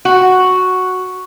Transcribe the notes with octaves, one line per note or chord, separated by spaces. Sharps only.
F#4